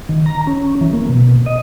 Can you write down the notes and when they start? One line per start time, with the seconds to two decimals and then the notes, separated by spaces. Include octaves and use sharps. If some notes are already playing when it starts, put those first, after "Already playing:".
0.09 D#3
0.26 A#5
0.47 C#4
0.81 E3
0.93 A#3
1.09 B2
1.46 D#5